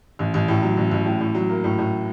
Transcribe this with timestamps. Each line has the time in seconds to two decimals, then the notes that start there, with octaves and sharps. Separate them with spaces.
0.19 A1
0.34 A1
0.48 A2
0.62 F#3
0.77 A1
0.91 A1
1.06 A2
1.21 A2
1.35 F#3
1.49 A#3
1.64 A2
1.79 A2